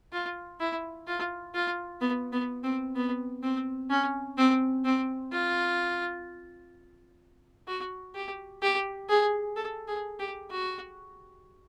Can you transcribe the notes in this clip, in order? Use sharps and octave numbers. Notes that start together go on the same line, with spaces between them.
F4
E4
F4
F4
B3
B3
C4
B3
C4
C#4
C4
C4
F4
F#4
G4
G4
G#4
A4
G#4
G4
F#4